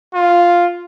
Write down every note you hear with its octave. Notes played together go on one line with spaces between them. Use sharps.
F4